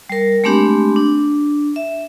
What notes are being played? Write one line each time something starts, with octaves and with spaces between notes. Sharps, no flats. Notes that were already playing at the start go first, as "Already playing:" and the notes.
G3 A#4
G#3 A3 C4 D4 G4 B5
D4
E5